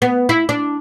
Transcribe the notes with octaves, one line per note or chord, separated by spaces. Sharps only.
B3
E4
D4